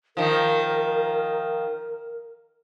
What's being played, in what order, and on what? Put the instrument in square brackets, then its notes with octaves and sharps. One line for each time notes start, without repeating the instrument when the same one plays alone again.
[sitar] D#3 F3 [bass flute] A#4